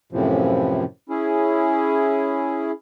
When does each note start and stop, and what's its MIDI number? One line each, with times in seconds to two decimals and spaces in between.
0.12 0.84 42
0.12 0.84 45
0.12 0.84 48
0.12 0.84 52
0.12 0.84 53
1.09 2.71 61
1.09 2.71 64
1.09 2.71 68